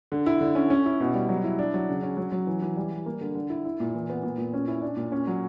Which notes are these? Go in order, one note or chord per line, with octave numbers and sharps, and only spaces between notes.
D3
E4
D3
C#4
C#4
E4
B2
G3
F#3
E4
D4
F#3
C#3
C#4
F#3
F#3
E3
E3
G3
G3
A#3
D3
D3
E4
E4
A#2
E3
B3
A#2
A#2
C#4
E4
D4
A#2
C#4
F#3